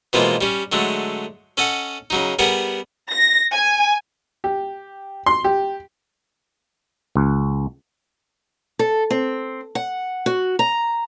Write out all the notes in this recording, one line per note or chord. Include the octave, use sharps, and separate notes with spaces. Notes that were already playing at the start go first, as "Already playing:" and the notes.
B2 E3 F3 G#3 A#3 F4
G3 C#4
D3 F#3 G#3 A3
C#4 A4 D#5 F#5
C#3 F#3 D#4
G3 B3 G#4 A#4 F#5
A#6
G#5
G4
C6
G4
C#2
A4
C4
F#5
F#4
A#5